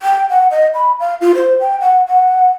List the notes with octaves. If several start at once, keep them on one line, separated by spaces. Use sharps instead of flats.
G5
F#5
D#5
B5
F5
F4
C5
G5
F#5
F#5